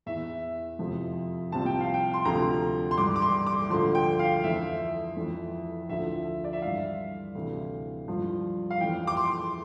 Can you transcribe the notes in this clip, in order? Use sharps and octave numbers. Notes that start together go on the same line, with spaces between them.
E2 E3 E5
F2 C3 F3
C2 C3 F3 A5
G5
F5
G5
C6
D2 C3 F3 A#5
C6
G2 E3 D6
D6
C6
D6
D2 D3 F3 C6
G5
F5
F2 E3 E5
F2 E3
D2 D3 F3 E5
D5
E5
G2 E3 F5
D2 C3 E3
G2 F3
F5
F2 E3 G5
D6
C6